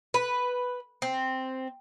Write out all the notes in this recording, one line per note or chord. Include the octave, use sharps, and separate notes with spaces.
B4
C4